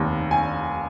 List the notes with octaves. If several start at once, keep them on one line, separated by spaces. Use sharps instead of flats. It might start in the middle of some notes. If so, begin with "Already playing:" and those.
Already playing: F1 D#2
G#5